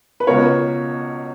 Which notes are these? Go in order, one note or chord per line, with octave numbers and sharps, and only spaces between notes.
B4
C#2 B2 A#4 C#5